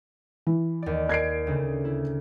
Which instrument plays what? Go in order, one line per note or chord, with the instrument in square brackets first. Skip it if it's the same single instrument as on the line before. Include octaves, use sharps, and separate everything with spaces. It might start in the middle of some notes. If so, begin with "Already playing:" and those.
[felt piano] E3
[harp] D#2 D5
[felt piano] G#6 C7 D7
[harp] D2 C#3
E4